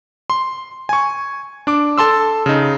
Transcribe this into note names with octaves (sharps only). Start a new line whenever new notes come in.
C6
G#5 C#6
D4 D6
A4 A5 C6 E6
C#3 D#4